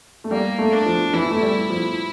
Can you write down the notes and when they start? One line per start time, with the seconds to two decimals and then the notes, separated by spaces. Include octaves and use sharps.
0.24 A3
0.31 G3 A#3
0.59 A3
0.72 D4
0.86 F3
1.14 E3 E4
1.31 A3
1.42 G3
1.70 F3